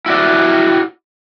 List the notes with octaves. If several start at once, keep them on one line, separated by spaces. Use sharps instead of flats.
E4 F#4 D5